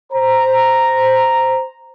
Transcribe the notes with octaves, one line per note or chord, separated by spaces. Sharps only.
C5 A#5